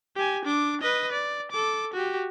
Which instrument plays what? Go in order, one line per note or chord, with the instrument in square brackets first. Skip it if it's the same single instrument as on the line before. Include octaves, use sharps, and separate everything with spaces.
[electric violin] G4 G#5
D4 D6
B4 D#5
D5
A4 D6
F#4 G4